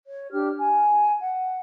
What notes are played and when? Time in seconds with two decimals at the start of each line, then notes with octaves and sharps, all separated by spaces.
0.07 C#5
0.32 D4 G4 F6
0.58 G#5
1.21 F#5